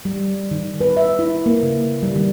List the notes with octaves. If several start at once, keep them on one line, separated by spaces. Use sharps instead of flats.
G3
D#3
B4
E5
E4
A#3
C#3
G3
D#3